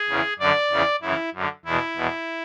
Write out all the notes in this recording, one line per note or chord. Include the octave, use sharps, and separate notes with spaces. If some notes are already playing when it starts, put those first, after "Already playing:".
Already playing: G#4
E2 C#3 E3
F#2 D3 D5
E2 C#3 E3
F#2 C#3 E3 E4
F#2 D3
E2 B2 E4
E2 B2